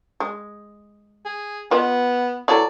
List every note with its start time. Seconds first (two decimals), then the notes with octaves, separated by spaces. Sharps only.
0.20 G#3
1.25 G#4
1.71 B3 F4 B4 D#5
2.48 E3 F#3 A4 D5